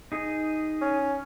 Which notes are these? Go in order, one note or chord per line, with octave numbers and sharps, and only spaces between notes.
D#4 G#4
C#4